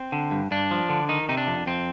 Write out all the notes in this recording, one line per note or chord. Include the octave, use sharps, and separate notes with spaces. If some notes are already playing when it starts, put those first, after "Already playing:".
Already playing: C4
D3
G2
G2 D4
F3
D3
D#3 D#4
C3 D#4
D4
F2
F2 C4